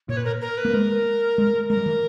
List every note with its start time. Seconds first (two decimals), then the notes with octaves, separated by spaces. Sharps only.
0.09 A#2 C#5
0.17 B4
0.25 A#4
0.41 A#4
0.58 B4
0.65 A#3
0.73 G#3 A#4
1.38 G#3
1.70 G#3 A#4
1.77 G3
1.86 E3